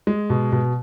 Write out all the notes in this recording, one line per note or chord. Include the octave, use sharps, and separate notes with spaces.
G#3
B2
B2